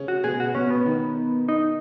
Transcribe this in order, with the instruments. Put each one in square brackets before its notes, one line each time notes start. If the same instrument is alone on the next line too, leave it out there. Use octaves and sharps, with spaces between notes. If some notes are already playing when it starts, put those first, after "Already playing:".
Already playing: [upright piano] C#3 C#4
[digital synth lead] F#4
[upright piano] B2 B3 [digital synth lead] G#4
[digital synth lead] F#4
[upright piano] B2 B3 [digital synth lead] C#4
[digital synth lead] B3
[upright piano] D#3 D#4
[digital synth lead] D#4